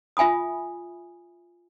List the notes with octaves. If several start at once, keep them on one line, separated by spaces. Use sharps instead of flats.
F4 E5 G#5 B5 D#6